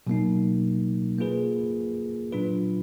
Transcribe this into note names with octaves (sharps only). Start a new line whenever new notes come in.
B2 F#3 A#3 D#4
A#3 F4 G#4 B4
A#2 F#3 D4 F4 B4